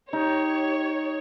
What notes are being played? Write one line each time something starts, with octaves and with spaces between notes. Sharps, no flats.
D#4 G4 C#5